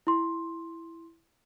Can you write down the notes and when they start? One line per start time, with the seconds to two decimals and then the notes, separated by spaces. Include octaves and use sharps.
0.07 E4 C6